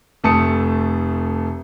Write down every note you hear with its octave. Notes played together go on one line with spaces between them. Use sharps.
F1 A3 A5 D#6 C#7